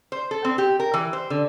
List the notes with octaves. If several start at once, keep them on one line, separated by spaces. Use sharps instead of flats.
C5
A4
C4
G4
A#4
E3
C5
D3